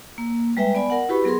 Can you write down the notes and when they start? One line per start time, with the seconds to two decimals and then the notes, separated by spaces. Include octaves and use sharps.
0.18 A#3
0.57 G3 G#3 B4 E5 G5
0.75 B3 D5 G#5 B5
0.90 A#4 F#5
1.09 E4 F#4 G4 B4 B5 C#6
1.24 F#3 B3 G#4 A#4 C6